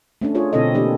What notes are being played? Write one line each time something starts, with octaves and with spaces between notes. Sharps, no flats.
A3 C#4 D4
F4 G#4 C#5
B2 D3 C4 E4 A4 D#5
E3 A#3 D4 G4 D5